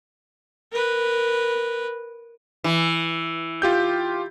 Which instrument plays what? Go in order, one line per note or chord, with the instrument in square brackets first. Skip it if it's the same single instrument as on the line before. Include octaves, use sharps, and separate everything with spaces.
[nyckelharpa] A#4 B4
[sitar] E3
[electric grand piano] F4 G4 G6